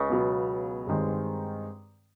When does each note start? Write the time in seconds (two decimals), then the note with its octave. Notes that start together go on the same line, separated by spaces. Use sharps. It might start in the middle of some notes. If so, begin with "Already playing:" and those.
Already playing: C#2 C#3
0.09 B2 F#3 B3
0.87 G2 D#3 G#3 C4